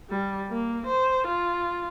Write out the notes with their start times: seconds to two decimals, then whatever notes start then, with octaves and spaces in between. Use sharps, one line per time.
0.10 G3
0.50 A#3
0.86 C5
1.27 F4